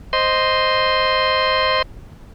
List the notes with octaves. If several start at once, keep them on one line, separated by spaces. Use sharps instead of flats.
C5 D#5 C6